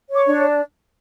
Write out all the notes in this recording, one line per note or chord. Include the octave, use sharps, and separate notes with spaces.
C#5
D6
D4